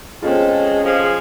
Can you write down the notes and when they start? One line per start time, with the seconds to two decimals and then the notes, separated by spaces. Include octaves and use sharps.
0.22 G#3 C4 C#4 F4 A4
0.84 F3 G#4